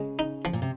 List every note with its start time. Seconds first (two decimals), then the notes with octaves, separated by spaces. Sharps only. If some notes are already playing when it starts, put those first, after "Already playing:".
Already playing: C#3 G#3
0.19 D#4
0.45 F3
0.53 A#2
0.62 C3